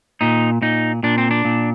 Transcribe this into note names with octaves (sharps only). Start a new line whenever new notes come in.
A#2 D#4
A#2 D#4
A#2 D4
C4
D4
A#2